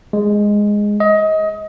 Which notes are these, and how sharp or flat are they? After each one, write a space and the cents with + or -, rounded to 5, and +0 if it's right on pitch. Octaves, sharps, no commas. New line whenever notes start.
G#3 -5
D#5 +25